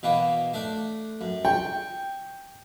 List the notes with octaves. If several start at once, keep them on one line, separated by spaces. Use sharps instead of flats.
B2 E3 A#3
A3 D4
F#2
G5 C#6